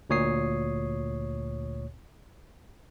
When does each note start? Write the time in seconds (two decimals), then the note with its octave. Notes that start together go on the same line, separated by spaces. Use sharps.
0.10 D2 A#2 C#5 D#6 C7